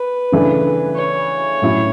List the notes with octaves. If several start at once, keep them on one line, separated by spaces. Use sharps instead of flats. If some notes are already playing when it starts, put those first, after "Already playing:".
Already playing: B4
C#3 E3 A3 D4
C#5
A2 F#3 C#4 E4